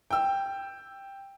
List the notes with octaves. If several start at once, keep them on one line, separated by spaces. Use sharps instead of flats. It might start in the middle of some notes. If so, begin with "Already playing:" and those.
G5 E6